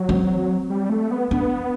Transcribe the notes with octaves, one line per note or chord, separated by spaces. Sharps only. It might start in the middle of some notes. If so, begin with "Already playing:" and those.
Already playing: F#3
C4
G3
A3
B3
B3 D4